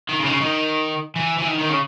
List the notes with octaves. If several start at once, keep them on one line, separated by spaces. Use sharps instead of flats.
D#3
C#3
D#3
C#3
D#3
E3
E3
D#3
D#3
C#3